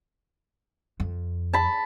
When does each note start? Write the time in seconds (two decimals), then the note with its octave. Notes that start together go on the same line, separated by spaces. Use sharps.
1.00 F2
1.53 A5 B5